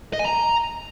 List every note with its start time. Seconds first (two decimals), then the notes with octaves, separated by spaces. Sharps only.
0.13 D#5
0.19 G#5
0.25 A#5